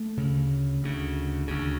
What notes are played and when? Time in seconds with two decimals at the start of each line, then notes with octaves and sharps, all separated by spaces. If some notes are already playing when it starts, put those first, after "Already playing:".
Already playing: A3
0.17 D2 C#3
0.83 D2 C#3
1.47 D2 C#3